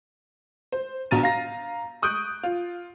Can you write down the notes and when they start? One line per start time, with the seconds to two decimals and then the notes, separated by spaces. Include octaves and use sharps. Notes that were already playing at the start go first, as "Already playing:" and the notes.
0.72 C5
1.11 A#1 B2 A#5 A6 D#7
1.23 F5 A#5 A#6
2.02 C#6 D#6 F#6 G6 D7
2.43 F4